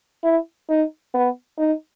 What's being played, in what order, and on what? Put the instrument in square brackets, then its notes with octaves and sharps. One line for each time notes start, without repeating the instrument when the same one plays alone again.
[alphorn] E4
D#4
B3
D#4